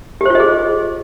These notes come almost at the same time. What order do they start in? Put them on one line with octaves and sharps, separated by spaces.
G4 C5 F4 D#5 G#4